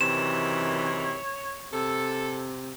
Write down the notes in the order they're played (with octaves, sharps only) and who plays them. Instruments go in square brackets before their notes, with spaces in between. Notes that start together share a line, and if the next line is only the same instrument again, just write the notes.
[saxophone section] F#2 D#3 E3 [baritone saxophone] C3 [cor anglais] C#5 [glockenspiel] E7
[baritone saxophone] C3 [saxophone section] A4